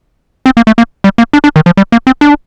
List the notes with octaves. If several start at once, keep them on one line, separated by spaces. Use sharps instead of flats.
C4
A#3
A3
A#3
G3
A#3
D4
D4
D#3
F3
G3
A#3
C4
D4